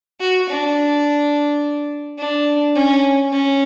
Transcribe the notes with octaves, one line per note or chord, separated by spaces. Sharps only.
F#4
D4
D4
C#4
C#4